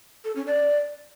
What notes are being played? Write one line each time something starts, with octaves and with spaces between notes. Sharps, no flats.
A4
C#4
D5